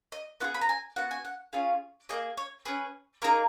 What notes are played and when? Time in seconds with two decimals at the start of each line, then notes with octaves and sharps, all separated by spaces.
0.12 D#5
0.40 B3 F4 G#4 F#5
0.54 B5
0.61 A#5
0.69 G#5
0.96 B3 F#4 F#5
1.11 G#5
1.25 F#5
1.53 C#4 F4 G#4 F5
2.09 A#3 D#4 G#4 D#5
2.37 C#5
2.65 C#4 G#4 B4
3.22 A#3 D#4 G#4 A#4